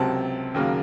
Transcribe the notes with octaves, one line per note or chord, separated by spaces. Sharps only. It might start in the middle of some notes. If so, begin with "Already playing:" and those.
Already playing: C#2 C3 F#3 C4 A5
D#2 C#3 F#3 A#3